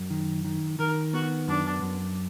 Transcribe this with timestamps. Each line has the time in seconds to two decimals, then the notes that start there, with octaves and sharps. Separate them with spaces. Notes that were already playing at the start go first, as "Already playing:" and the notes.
Already playing: F#2
0.10 D#3
0.45 D#3
0.79 D#3 A#4
1.13 B3 F#4
1.48 F#2 D4
1.82 F#2